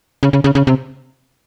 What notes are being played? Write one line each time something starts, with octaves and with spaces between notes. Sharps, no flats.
C#3
C#3
C#3
C#3
C3